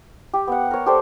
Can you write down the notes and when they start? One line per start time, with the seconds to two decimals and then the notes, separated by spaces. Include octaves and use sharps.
0.34 G4
0.48 B3 F#5
0.71 A#4 C#5
0.86 G4 A4 C5 D5